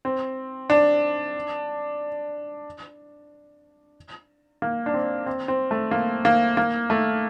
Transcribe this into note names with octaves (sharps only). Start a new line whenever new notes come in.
C4
D4
A#3
D4
C4
C4
C4
A3
A#3
A#3
A#3
A3